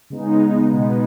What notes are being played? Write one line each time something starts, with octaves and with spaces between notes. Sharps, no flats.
C#3 G#3 B3 D#4
B2 G#3 B3 D#4